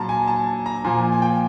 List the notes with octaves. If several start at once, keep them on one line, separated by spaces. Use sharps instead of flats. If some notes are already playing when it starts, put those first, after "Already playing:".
Already playing: A#2 F#3 A5 A#5
G#5
A5
A#5
A#2 F3 G#5
G#5
G5